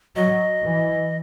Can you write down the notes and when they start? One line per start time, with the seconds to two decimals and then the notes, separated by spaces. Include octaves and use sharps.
0.16 F#3 D#5
0.64 E3